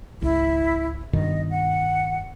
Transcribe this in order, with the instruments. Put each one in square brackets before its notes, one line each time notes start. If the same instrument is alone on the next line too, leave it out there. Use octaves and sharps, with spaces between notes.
[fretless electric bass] G#1 C#2 [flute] E4
[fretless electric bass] G2 B2 D#3 [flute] D#5
[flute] F#5